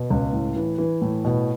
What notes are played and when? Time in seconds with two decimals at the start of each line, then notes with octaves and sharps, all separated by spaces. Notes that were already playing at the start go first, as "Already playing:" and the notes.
Already playing: B2
0.10 C#2
0.33 A2
0.56 E3
0.78 E3
1.01 A2
1.25 B2